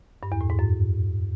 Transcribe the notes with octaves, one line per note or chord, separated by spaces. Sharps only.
G2
E2
A2
G#2
F#2